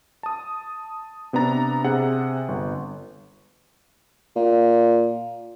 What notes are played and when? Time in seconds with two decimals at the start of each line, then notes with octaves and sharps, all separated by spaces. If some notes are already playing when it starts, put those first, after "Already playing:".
0.23 A5 D#6
1.33 C3 B3 D4 A#5 A6
1.84 C3 G#4 F#5
2.48 G1
4.36 A#2